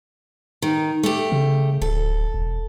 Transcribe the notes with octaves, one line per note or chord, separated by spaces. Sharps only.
D#3
A3 G4
C#3
D1 A4
E1